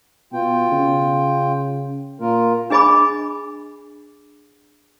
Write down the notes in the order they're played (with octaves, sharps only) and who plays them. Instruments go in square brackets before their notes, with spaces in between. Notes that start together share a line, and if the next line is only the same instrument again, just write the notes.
[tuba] B2 [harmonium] F4 G5
[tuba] C#3
[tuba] A#2 [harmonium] F4 A#4
[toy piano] D4 G#4 D#5 G#5 B5 D6